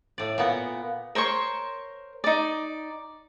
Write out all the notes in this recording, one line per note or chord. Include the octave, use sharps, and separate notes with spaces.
A2 D5
A#2 B3
A#4 C5 C#5 C#6
D#4 D5